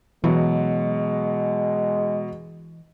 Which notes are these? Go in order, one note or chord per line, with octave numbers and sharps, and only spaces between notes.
B2 E3 F#3 G#3